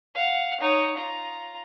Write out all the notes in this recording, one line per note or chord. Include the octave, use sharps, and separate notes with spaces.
F5 F#5
D#4 C#5
F4 A#5